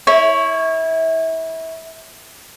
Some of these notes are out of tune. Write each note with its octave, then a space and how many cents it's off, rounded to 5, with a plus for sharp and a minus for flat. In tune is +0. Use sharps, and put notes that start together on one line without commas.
E4 -25 C#5 +0